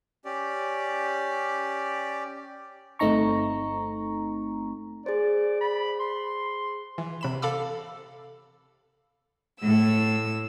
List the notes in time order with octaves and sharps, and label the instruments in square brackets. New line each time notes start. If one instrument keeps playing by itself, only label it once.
[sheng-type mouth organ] C#4 G4 D5
[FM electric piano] G1 A3 C4 D#4 A#5 C#6
[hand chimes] G#4 C5 [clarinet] D5
[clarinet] B5
C6
[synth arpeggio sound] E3
C3 B5 E7
A4 F5 B5 D6 E6
[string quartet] A2 E6